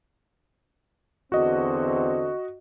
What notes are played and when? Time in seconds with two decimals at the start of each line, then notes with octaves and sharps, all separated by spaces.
1.32 E2 D3 C4 F#4 D#5